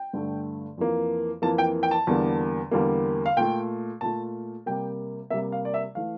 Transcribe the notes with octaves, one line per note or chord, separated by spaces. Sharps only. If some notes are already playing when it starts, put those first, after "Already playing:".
Already playing: G5
G2 D3 A3
F2 E3 A#3
F2 E3 A#3 A5
G5
G5
A5
E2 D3 G3 A#3
E2 D3 G3 A#3
F5
A#2 A3 G5
A#2 A3 A5
C3 G3 A#3 G5
C3 G3 A#3 E5
F5
D5
E5
E3 A3 F5